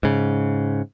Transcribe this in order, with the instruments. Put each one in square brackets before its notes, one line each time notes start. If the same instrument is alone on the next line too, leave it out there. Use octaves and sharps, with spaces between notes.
[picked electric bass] G#2 C#3